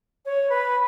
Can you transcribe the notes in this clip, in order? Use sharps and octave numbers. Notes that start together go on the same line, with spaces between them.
C#5
B4